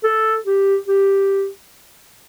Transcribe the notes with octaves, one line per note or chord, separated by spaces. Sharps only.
A4
G4
G4